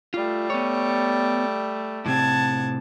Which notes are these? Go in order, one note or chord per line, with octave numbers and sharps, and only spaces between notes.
G3 A3 F4
B3 C#5
A2 C3 C4 F#5 A5 G#6